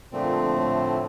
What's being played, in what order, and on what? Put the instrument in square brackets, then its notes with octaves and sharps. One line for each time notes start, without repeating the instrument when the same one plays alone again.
[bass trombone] A#2 [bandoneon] D3 F3 A3 C4
[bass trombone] A2